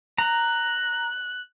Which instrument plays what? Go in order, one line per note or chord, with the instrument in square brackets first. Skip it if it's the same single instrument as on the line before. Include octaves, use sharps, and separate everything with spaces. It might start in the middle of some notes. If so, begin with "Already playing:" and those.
[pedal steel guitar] A#5 [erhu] F#6